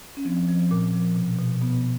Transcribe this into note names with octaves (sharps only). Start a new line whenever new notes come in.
C#4
F3 C4
F3
A#2
F3
B2
B2
B2 B3